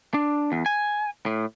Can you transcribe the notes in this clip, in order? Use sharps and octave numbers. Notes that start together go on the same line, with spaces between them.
D4
E2
G#5
A2